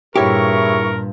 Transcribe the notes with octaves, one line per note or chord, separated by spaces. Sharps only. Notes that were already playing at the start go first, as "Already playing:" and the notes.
G2 A#2 E4 G4 G#4 A#4 C#5 C#6